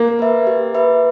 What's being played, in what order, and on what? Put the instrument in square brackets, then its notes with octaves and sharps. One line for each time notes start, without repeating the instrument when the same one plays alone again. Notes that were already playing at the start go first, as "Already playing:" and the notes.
Already playing: [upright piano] A#3
[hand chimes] B4 E5
G4
B4 E5